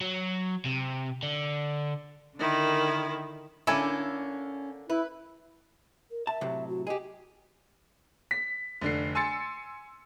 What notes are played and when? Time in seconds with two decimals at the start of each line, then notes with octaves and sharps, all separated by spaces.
0.01 F#3
0.65 C3
1.23 D3
2.37 D3 D#3 E4 A#4
3.67 D3 A#3 C#4 D4 E4 A4 G#5
4.89 E4 B4
6.11 A#4
6.27 E5 A5
6.41 A2 C3 F#3
6.68 F#4
6.87 G4 G#4 D#5
8.31 B6
8.81 F1 D3 C7
9.15 G#5 C6 E6 A6 C#7